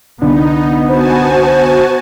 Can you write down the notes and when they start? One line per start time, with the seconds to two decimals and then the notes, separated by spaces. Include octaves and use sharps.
0.22 C2 D3 B3 D4 D#4
0.88 F#4 C5 G#5 A5